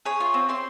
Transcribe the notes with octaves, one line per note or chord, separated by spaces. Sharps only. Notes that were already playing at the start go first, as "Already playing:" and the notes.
G#4 C#5
F4
C4
C4 C6